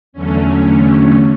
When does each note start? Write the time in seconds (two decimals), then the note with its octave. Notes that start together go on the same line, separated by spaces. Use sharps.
0.13 E2 D3 F#3 A3 C#4